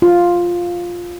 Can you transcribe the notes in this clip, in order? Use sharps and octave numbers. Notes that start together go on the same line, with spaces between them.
F4